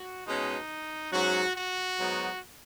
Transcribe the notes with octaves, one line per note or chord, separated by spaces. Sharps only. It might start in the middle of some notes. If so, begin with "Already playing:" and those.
Already playing: F#4
B2 G#3 C#4 D#4
G#2 F#3 C#4 F#4
F#4
G#2 F#3 B3 D#4